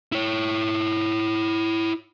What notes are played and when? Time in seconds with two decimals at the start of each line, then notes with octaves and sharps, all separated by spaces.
0.12 E4 C#5